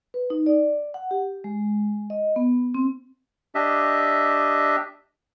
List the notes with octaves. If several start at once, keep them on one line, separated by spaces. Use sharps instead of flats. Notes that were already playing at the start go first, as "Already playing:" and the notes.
B4
D#4
D5
F#5
G4
G#3
D#5
B3
C4
D4 G4 D#5 E5